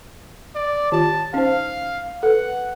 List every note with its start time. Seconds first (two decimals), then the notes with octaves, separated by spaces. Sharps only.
0.55 D5
0.92 D#3 F4 G4 A5
1.34 C#4 D#4 C5 F5
2.23 A4 B4 F#5